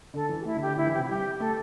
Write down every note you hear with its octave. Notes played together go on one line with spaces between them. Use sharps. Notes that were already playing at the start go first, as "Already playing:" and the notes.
D3 A4
E3
G4
A3 E4
D3
G4
D3
D3 E4
E3
C3 G4
E4
G3 G4
A3 A4